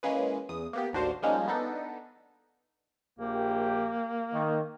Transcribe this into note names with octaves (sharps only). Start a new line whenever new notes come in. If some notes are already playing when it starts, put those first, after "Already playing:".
E3 G#3 A#3 C#4 G#4 B4
E2 D#6
A#3 B3 G4
A1 D#2 D4 F#4 C5 F5
F3 G3 G#3 A#3 C#4 D#4
B3 D4 D#4 A4
A#1 A#3 G4
D#3